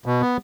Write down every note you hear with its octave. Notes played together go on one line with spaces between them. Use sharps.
B2
B3